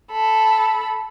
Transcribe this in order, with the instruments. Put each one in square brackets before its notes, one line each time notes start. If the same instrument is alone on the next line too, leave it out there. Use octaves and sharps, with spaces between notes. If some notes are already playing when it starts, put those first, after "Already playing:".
[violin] A4 B5